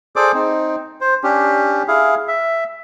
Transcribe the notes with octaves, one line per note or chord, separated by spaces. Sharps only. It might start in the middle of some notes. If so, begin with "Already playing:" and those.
G#4 A4 C5 D5 D6
C4 D#4
C5
C#4 D4 G4
E4 G#4 F5
E5